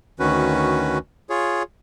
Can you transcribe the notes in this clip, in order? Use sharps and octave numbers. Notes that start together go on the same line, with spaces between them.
D2 D#3 C#4 F#4 B4
F4 G#4 C#5